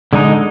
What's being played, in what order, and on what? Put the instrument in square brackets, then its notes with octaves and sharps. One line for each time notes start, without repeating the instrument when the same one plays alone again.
[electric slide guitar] D3 G#3 D#4